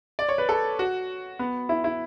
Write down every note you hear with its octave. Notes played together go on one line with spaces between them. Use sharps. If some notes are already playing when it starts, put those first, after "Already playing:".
D5
C#5
B4
A4
F#4
B3
E4
E4